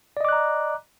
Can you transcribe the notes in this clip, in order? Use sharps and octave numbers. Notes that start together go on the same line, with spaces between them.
D5 D#5 A#5 D6 F#6